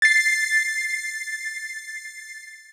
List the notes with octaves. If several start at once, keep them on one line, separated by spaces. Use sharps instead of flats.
A6 C7